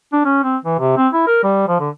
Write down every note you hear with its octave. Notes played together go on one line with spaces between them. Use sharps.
D4
C#4
C4
E3
C3
C4
E4
A#4
G3
F3
D3